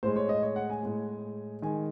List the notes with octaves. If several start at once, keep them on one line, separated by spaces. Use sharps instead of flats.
A2 G#3 C5
C#5
D#5
C#5
F#5
G#5
A2 G#3
D#3 G#3 G#5